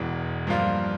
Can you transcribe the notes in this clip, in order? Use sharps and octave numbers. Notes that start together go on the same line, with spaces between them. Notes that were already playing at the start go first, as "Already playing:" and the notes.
Already playing: E1 E2 E3
G2 F3 A#3 F4